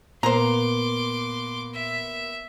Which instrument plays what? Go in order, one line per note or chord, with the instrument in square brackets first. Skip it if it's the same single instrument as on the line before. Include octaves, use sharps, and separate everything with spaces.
[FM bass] A#2 [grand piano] A#3 B3 [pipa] C5 A#5 [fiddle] C6 D6
[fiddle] E5